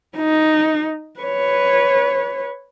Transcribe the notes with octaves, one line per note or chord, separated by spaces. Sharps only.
D#4
B4 C#5